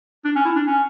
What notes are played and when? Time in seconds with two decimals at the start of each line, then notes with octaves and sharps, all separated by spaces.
0.25 D4
0.36 C#4
0.45 E4
0.56 D4
0.67 C#4